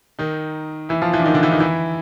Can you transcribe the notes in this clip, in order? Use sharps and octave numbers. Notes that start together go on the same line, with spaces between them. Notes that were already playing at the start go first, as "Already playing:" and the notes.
D#3 D#4
E3 E4
F3 F4
E3 E4
D4
D#3 D#4
D3 D4
E3 E4
D#3 D#4
E3 E4